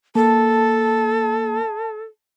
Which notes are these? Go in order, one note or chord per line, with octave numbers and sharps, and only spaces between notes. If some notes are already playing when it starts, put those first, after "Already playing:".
A#3 A4 A5